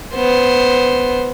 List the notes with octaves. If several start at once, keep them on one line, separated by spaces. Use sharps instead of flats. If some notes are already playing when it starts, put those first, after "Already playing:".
B3 C5